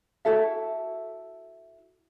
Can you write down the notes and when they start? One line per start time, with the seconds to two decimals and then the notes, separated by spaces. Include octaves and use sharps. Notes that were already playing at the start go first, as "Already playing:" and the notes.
0.25 E4 F#4 A4 E5